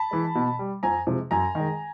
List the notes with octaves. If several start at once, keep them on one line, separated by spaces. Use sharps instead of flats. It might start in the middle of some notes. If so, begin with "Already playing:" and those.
Already playing: A5 B5
E3 G#3
B2
G3
F2 G#5 A#5
C3 F3 G#3
F#2 G#5 A#5
D#3 G#3